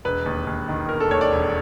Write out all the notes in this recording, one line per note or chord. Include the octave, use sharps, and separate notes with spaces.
E1 B4
D#2
D#2
D#3
E1 A#4
A4
D#2 C#5
D5
E1